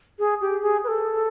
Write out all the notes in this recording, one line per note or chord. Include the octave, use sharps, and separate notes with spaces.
G#4
G4
G#4
B4
A4